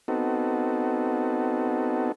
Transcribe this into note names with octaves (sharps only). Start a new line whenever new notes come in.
B3 C4 D#4 F#4 A4